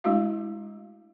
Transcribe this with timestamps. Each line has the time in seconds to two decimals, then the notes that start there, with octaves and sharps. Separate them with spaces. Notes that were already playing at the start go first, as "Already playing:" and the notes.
0.04 G#3 A3 D4 E4 F#4 F5